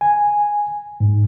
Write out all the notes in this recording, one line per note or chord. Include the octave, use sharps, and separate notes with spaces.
G#5
G#2